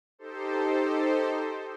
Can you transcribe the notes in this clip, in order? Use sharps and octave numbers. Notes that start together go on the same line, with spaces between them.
D#4 G4 A4 C5